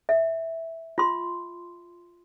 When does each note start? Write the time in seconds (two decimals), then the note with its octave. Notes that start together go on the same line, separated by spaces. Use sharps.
0.09 E5
0.98 F4 C6